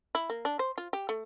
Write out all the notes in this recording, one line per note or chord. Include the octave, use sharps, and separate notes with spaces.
E4
A#3
D4
C5
F4
G4
A3